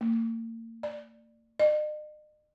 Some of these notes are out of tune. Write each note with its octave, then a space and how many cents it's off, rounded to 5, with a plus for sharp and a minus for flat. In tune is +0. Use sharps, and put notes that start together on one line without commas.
A#3 -40
D5 +15
D#5 -45